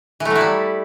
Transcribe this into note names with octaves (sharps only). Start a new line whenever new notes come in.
E3
A3
F#3
E4
G3